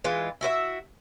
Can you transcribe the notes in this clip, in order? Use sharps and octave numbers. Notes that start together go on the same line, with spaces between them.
E3 G#3 F4
E4 F#4 B4 E5